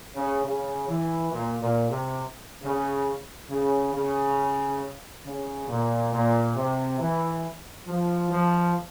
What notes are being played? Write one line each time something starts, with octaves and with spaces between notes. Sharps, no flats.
C#3
C#3
E3
A#2
A#2
C3
C#3
C#3
C#3
C#3
A#2
A#2
C3
E3
F3
F3